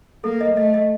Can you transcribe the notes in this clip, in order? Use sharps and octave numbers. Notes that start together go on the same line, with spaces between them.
A#3 A4
D#5
A3 D#5
D#5